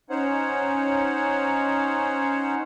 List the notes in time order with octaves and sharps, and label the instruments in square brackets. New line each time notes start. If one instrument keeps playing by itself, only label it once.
[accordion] C#4 D#4 C5 C#5 F#5